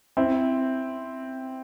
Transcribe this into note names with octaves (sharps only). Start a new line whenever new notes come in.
C4 E4